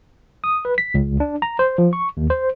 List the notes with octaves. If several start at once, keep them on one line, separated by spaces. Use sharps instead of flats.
D#6
B4
B6
C#2
D4
A#5
C5
F3
C#6
D#2
C5